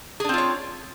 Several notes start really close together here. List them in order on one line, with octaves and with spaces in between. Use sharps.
G#4 D4 C4 F4 C#5